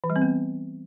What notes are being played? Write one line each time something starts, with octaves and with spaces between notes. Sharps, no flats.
E3
G3
C4
B3